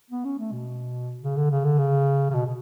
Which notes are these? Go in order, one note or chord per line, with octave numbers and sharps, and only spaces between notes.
B3
C#4
A3
B2
C#3
D3
C#3
D3
C#3
C#3
B2
B2